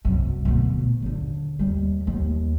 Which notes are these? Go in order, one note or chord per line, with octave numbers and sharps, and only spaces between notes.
C2 F#2
D2 B2
A#2
D#2 D3
D#2 G3
D#2 F3